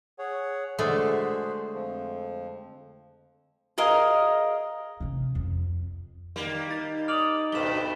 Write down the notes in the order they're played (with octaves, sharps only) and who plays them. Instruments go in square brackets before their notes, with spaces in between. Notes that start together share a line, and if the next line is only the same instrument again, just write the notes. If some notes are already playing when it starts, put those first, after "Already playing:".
[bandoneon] G#4 C#5 F#5
[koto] D3 G#3 A3 [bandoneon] F#4 G#4 C5
[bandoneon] F2 F3
[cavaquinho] G#4 A#4 D#5 F5
[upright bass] C3 E3
F2
[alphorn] D#3 [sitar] G3 A#3
[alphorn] D#4 [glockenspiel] A6
[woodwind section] D6 D#6 [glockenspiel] F6 F7 F#7
[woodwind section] D2 B4 [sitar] G2 B2 [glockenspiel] E7 G7